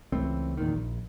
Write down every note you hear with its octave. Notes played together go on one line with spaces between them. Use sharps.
C#2 E3 A3 C4
E2 A#2 D#3
A#1